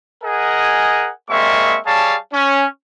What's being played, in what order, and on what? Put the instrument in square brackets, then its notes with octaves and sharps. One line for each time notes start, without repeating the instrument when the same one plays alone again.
[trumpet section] G#4 A#4 D#5 F#5 G#5
G3 G#3 A#3 C4 E5 C#6
G3 G#4 C#5 F5 A5
C#4